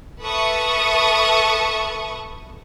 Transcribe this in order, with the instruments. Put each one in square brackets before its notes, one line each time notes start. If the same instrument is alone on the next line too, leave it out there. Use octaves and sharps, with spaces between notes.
[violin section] A4 B4 E5 C#6 D#6